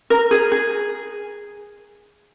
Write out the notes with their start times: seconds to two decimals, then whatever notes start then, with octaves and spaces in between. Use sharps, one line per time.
0.10 A#4
0.31 G#4
0.52 G#4